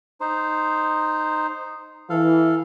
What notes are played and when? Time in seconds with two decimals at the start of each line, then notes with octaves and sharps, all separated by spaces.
0.21 D#4 C5
2.10 E3 A4 F5